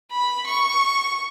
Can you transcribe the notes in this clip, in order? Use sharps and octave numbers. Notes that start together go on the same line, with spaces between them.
B5
C#6